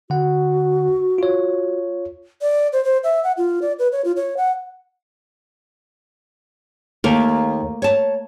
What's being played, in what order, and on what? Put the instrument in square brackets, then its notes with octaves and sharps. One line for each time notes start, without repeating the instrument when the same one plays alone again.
[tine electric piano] D3 F#5 [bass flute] F#4
[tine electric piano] F4 C#5
[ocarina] D5
C5
C5
E5
F#5
F4
D5
B4
C#5
F4
C#5
F#5
[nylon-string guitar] D#2 [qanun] A3 A#3 A#4
[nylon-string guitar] C#5 A5